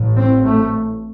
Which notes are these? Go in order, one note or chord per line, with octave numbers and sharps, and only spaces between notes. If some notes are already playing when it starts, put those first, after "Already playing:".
Already playing: A1 A2
C4
A3